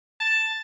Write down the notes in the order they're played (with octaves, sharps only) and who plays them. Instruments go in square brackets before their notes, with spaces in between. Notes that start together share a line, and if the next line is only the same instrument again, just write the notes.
[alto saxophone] A5